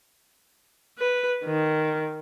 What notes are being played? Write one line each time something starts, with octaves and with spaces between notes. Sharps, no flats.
B4
D#3